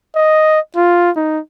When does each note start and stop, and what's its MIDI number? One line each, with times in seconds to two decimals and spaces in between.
0.16 0.60 75
0.76 1.10 65
1.16 1.39 63